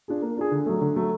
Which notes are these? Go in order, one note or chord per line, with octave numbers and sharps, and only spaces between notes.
D4 F4 G#4
A#3
D4 F4 G#4
D3
F#3 A3
D3
F#3 A3